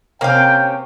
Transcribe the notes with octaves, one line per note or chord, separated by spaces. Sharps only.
C3 A#3 C4 C#4 F5 G5